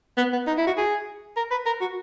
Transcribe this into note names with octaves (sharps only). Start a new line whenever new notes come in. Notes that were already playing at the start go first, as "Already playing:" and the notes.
B3
B3
D#4
E4
F#4
G#4
A#4
B4
A#4
F#4